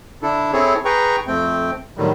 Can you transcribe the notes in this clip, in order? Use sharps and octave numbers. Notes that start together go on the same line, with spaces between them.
D3 D4 E4 A4
C4 E4 G#4 A4 C#5
G#4 B4 G5 A#5 C#6
F2 A3 C4 G5
A2 D3 D#3 F#3 G3